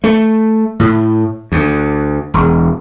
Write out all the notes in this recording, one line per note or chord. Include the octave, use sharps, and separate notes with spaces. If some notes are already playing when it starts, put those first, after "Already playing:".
A3
A2
D2
E1